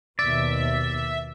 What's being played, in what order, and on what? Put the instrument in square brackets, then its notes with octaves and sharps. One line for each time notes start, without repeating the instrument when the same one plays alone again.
[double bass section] D#2 B2 [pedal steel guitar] D5 [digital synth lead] E5